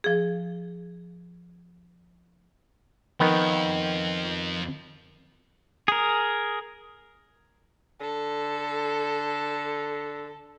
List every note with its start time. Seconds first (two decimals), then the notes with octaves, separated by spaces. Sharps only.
0.04 F3 G#4
3.20 F2 D#3 B3
5.88 G#4 A#4
8.01 D3 A4